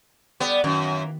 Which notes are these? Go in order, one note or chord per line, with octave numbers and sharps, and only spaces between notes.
D3 G3 B3 G4
F#2 D#3 E3 A#3